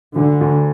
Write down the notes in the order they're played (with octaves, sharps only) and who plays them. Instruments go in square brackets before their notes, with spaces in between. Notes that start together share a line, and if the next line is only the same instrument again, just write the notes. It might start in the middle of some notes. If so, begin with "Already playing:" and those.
[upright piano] D2 [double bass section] D3
[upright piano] D2